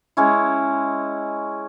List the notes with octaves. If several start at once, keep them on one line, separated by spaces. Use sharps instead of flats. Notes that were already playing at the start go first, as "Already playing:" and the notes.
G#3 C#4 E4